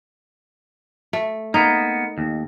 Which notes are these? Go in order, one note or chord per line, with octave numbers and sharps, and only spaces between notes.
A3
A#3 B3 D#4
D#2